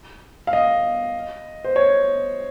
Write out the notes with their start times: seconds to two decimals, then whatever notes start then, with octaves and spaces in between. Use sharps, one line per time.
0.47 F5
0.53 D#5
1.65 C5
1.76 C#5